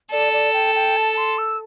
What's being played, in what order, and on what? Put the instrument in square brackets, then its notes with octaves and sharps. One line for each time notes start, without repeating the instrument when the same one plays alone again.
[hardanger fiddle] A4 [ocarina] D5
[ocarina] D5
G5
G5
A5
C6
E6